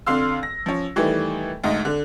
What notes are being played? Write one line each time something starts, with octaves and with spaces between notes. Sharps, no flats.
F2 D3 F5 C6 E6
A#6
F3 C#4
D#3 E3 G3 A3
D2 G#2 D#4
D3